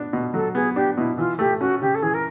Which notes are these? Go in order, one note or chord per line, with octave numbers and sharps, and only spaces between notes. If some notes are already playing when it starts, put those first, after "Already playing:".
Already playing: B3 D4
B2
F#3 A4
B3 G#4
D4 G4
B2 E4
E3 F4
A3 G4
C#4 F#4
C#3 G4
A4
E3 G#4
A#4